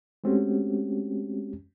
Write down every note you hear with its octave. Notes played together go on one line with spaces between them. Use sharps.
G#3 A3 C4 C#4 F#4 G4